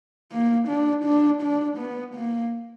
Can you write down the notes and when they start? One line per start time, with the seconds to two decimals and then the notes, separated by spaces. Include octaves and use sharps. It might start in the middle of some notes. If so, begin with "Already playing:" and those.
0.32 A#3
0.68 D4
1.05 D4
1.42 D4
1.78 B3
2.15 A#3